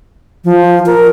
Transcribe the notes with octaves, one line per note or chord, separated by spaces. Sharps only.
F3
A#4